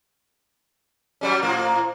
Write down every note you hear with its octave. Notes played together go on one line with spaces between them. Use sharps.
F#3 G3 C#4
A2 F3 A#3